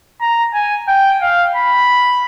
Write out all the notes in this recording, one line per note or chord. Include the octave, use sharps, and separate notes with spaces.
A#5
G#5
G5
F5
B5